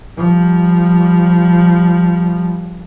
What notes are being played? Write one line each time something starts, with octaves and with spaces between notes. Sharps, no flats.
F3 G3